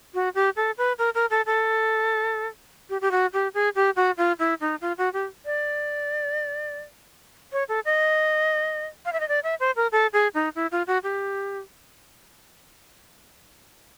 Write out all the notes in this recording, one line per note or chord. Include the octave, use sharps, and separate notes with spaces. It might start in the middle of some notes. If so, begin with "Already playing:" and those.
F#4
G4
A4
B4
A#4
A#4
A4
A4
G4
G4
F#4
G4
G#4
G4
F#4
F4
E4
D#4
F4
F#4
G4
D5
C#5
A4
D#5
F5
E5
D#5
D5
E5
C5
A#4
A4
G#4
D#4
E4
F4
F#4
G4